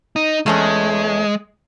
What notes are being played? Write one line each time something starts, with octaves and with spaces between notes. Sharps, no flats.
D#4
E2 G#3 A3 C#4